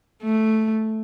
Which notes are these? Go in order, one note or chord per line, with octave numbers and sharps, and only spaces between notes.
A3